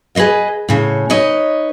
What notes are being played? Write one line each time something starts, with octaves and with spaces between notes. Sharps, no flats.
G#4 B4 C5 D#5 F5
A2 C#3 C#5
D#4 B4 C#5 D#5